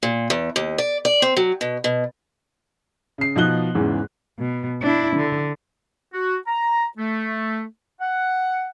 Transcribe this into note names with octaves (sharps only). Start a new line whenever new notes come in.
A#2
E2
D#2
D5
D5
C4
F#3
B2
B2
C#3 C7
B2 F3 D#4 F#6 G7
E2 G#2 C#3 E3
B2
D4 E4
D3
F#4
A#5
A3
F#5